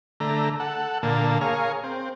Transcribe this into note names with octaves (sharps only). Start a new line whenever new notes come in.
D3 A3 A#5
A4 F#5
A#2 D3 A#3 A5
G#4 A#4 C#5 F5
C4